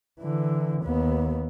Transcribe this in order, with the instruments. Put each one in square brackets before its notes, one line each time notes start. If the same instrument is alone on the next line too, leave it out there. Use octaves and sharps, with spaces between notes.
[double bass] D3 E3
D#2 B3